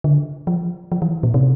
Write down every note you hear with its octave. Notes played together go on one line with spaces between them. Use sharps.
D3
F3
F3
E3
A#2
C3